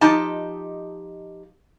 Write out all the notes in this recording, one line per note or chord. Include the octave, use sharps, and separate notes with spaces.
F3 D#4 G4 D#5 A5